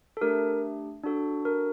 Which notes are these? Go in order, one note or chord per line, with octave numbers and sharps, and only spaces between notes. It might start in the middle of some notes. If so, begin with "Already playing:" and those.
A4
A3 D4 G4 A#4
D4 F#4 A4
A#4